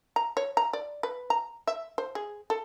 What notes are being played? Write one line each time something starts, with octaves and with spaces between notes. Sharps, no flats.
A#5
C#5
A#5
D5
B4
A#5
E5
C5
G#4
A4